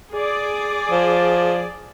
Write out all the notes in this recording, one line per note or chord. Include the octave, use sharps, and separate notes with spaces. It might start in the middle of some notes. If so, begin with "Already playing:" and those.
G#4 D5
F3